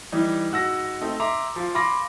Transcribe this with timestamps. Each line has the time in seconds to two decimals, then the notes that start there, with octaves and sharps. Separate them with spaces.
0.12 E3 G3 D#4
0.52 G#2 F#4 E6 A#6
1.01 A3 C4 D#4
1.20 E5 A#5 C6 D6
1.56 F3 F4
1.75 F5 G#5 B5 C6 D6 A#6